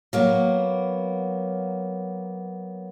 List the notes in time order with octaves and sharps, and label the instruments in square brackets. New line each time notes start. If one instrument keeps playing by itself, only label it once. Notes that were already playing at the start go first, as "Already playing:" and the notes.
[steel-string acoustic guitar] F#3 A#3 B3